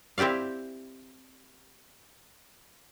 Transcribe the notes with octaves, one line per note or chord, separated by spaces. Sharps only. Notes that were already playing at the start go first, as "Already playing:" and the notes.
C4 E4 G4 D5 F5